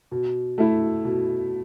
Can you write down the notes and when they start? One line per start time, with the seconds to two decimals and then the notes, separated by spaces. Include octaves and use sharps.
0.11 B2
0.58 A3 E4
1.04 B2